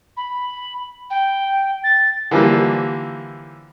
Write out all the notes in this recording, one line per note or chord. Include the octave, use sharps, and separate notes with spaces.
B5
G5
A6
D3 E3 F3 G3 A#3